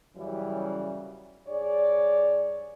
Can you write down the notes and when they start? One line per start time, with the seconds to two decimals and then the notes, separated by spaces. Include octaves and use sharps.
0.16 F#2 C#3 E3 F#3 G3
1.48 G2 G#4 C#5 D5